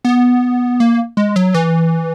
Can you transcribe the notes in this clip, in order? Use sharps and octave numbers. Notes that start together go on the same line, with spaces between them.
B3
A#3
G#3
F#3
E3